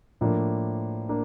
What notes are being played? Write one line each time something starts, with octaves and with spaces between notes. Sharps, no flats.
A2 F3 A#3 D4
A#3 D4